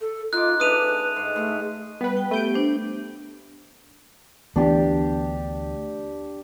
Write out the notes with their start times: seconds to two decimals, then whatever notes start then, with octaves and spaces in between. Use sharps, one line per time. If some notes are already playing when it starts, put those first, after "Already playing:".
0.01 A4
0.33 D#4 F4 D6 F#6
0.60 C#3 A3 D4 B4 D#6 D#7 F7
1.16 G#2
1.36 G#2 A3
2.01 G3 B3 B4
2.17 G5
2.31 A3 B3 G4 G6 D7
2.54 D4 C5
4.56 D2 E3 B3 D4 G4